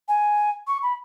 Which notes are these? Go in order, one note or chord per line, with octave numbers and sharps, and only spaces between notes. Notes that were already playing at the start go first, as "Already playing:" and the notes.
G#5
C#6
B5